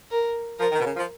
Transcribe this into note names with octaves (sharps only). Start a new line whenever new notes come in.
A#4
F3 A#4
D#3
B2
C#3
F3